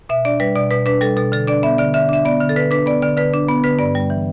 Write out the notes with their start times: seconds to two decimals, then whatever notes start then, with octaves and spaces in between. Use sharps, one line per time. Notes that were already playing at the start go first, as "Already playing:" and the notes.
0.09 B2 E5
0.25 D4 D5
0.40 G3 B4
0.56 B2 D5
0.71 B2 B4
0.86 D4 B4
1.01 G3 A4
1.17 B2 A4
1.32 D3 A4
1.47 D4 D5
1.63 B3 E5
1.78 D3 D5
1.94 D3 E5
2.09 D4 E5
2.25 B3 D5
2.41 D3
2.49 A4
2.56 D3 B4
2.71 D4 B4
2.86 B3 D5
3.02 D3 D5
3.17 D3 B4
3.34 D4
3.49 B3
3.64 D3 B4
3.79 G2 D5
3.95 G3
4.10 E3